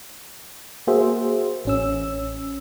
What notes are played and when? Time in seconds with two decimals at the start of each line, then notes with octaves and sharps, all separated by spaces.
0.87 A#3 F#4 G#4 C5 E5
1.65 A1 C#4 E6